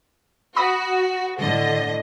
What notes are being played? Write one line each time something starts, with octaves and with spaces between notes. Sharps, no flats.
F#4 B5 D#6 A#6
A2 D3 D#5